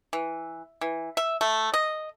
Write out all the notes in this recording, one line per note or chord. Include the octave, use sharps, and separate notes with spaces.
E3
E3
E5
A3
D#5